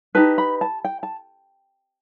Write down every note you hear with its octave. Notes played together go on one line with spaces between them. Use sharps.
D#4 G4 B4 A5
B5
A5
G5
A5